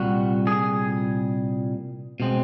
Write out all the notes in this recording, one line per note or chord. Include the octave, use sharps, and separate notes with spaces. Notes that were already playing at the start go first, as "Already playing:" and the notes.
Already playing: C2 A#2 G3 F#4
G#4
B2 G#3 C4